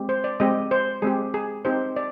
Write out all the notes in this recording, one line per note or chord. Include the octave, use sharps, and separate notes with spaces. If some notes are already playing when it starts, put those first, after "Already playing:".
Already playing: G#3 C4 G4
C5
D5
G#3 C4 G4 D#5
C5
G#3 C4 G4 G#4
G#4
C4 D#4 G4 C5
D5